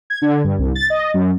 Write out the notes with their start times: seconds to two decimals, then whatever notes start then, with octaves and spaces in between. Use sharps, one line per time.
0.10 G#6
0.22 D3
0.44 G2
0.59 C2
0.75 A6
0.90 D#5
1.14 F#2